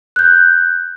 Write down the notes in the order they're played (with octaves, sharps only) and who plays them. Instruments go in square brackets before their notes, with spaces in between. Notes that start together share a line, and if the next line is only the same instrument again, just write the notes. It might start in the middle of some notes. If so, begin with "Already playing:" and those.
[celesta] F#6 G6